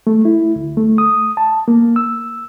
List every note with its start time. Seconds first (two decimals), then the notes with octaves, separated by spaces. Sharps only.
0.07 A3
0.25 E4
0.56 D2
0.77 A3
0.98 D#6
1.37 A5
1.68 A#3
1.96 E6